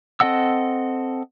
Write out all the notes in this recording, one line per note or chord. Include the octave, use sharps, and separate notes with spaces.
C4 A4 D#5 F#5 E6